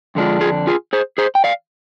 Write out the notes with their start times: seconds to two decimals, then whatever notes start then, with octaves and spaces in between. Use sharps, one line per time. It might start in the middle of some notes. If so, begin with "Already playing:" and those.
0.15 F2 D3 G#3 D4 F4
0.41 F4 G#4
0.67 F4 G#4
0.93 G#4 C5
1.18 G#4 C5
1.35 G5
1.44 D5 F5